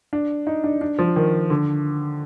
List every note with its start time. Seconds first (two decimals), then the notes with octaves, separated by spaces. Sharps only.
0.13 D4
0.47 D#4
0.64 D4
0.81 D4
0.99 F3
1.16 D#3
1.50 D3